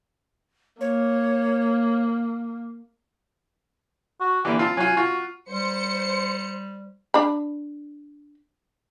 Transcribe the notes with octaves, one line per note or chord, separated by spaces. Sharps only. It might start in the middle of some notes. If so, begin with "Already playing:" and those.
A#3 C#5
F#4
A#2 D3 E3 G4
C4 F4 A5
F#3 F4 G#5
F4 F#4
G3 C5 C#7
D4 B5